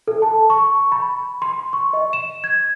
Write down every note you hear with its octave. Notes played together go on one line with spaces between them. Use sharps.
A4
A5
C#6
B5
C6
C#6
D#5
E7
G#6